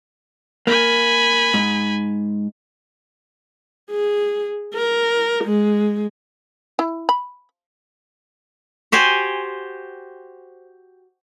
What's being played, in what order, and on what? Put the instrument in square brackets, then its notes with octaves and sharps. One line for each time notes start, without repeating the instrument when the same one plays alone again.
[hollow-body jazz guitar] A#3 [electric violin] G#5 B5
[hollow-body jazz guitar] G#2
[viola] G#4
A#4
G#3
[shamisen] E4
B5
[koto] F#4 G4 C5 G#5